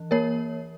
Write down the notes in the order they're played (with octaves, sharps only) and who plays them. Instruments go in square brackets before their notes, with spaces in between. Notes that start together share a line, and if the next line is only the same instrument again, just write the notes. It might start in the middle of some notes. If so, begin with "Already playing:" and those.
Already playing: [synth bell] E3
A#3 A#4 C#5